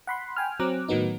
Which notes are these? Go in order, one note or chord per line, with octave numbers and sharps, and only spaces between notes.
F#5 B5 C6
G5 G#5 F6
F#3 C4 A#5 D6 F#6
A2 D#3 F#3 B3 D#4